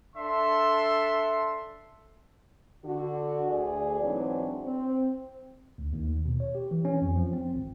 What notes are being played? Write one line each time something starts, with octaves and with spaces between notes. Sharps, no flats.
D4 A4 E5 C6
D3 F#4
D2 G#4 D5
G#2 E3 F#3 C4 D4
C4
D2
D#2
B2
C#5
G4
E3
C#4
F2
F3
C4
G#1